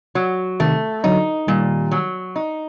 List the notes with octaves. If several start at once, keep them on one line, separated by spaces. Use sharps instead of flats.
F#3
C3 D#3 A3
D3 F#3 D#4
A#2 D#3 G3
F#3
D#4